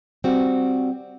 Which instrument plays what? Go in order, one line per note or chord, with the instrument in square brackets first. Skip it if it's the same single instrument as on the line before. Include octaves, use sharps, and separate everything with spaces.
[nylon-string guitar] G3 C4 F#4